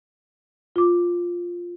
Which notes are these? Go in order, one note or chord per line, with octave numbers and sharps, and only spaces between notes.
F4 D6